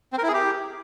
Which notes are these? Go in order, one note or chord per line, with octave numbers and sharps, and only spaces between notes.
C4
A#4
E4
G#4
G4